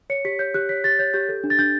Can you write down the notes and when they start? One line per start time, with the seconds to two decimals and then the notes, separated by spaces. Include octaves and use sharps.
0.10 C#5 C#7
0.25 G4 B6
0.39 C#5 G6
0.54 G4 F#6
0.69 C#5 B6
0.84 G4 A6
0.99 C#5 G6
1.14 G4 G6
1.29 A4
1.44 D4
1.50 A6
1.59 D4 G6